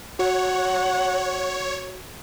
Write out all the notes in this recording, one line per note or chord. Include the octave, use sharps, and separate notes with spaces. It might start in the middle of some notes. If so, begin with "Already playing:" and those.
F#4 C#5 F#5